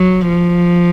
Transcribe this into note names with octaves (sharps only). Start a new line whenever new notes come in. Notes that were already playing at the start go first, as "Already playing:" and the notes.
Already playing: F#3
F3